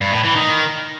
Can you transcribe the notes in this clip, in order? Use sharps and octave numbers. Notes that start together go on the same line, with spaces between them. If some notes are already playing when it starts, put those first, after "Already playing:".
G2
A2
E3
D#3